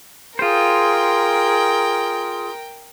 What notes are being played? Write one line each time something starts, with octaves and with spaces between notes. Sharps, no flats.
F4 G#4 A#4 C5 G5